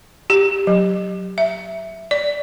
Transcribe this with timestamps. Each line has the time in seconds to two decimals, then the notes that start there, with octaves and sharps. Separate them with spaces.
0.30 G4
0.67 F#3
1.38 E5
2.11 D5